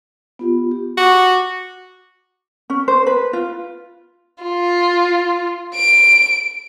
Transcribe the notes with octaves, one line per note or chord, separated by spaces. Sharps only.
B3 F4 G4
G4
F#4 D6
C#4
C5
B4
F4
F4
D7